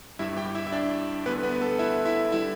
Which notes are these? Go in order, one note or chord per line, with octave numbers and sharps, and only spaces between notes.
G1 G2 G3 E4 E5
G4 G5
E4 E5
E5
D4 D5
D2 D3 G3 B3 B4
B3 B4
B4
A4
E4 E5
E4 E5
D3 G3 E4 E5